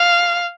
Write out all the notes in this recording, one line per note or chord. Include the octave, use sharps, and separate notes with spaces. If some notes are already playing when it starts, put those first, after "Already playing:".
Already playing: F5